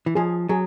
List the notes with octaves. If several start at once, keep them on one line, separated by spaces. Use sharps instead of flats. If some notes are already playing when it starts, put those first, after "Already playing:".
E3
F3 G#4
F#3 G#4